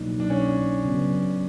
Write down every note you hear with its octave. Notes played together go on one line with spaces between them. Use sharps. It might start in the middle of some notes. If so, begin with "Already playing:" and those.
Already playing: C2 B2 F#3 A#3 D4 D#4
D4
C#4
C#3 F#3 B3